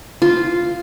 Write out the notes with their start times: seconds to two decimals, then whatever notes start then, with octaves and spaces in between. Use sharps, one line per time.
0.22 F4